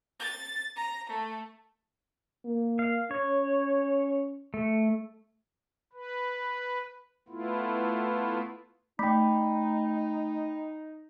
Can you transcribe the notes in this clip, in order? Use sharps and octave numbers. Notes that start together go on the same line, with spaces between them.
A6
A#5
A3
A#3
F5
C#4 C#5
A3
B4
A3 B3 E4 F4
A3 D#4 G5 B5